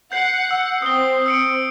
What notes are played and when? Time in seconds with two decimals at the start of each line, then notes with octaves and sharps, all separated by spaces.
0.12 F#5 G6 C7
0.51 E6
0.82 C4 D#6 G7
1.26 E6 C#7 D7